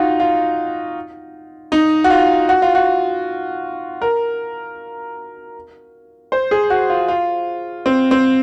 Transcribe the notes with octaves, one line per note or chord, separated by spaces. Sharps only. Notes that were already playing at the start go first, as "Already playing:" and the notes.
Already playing: D#4 F4 F#4
F4
D#4
F#4
F4
F#4
F4
F#4
A#4
C5
G#4
F#4
F4
F4
C4
C4